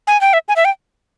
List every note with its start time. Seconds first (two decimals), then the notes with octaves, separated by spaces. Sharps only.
0.07 G#5
0.21 G5
0.33 E5
0.48 G#5
0.56 E5
0.65 G5